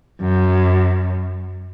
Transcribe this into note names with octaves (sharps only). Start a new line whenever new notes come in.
F#2